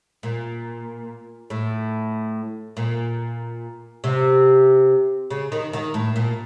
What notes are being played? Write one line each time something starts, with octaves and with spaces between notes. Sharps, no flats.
A#2
A2
A#2
C3
C#3
D#3
D#3
A2
A#2